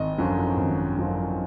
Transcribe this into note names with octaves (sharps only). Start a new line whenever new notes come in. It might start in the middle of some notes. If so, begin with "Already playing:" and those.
Already playing: G#1 D#5
F#2 D3 F3
G#1
F#2 D3 F3